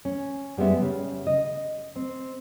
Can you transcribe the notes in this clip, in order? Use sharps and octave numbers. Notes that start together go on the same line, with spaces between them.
C#4
F#2 G3 G#3 B3 E5
C#3
D#5
C4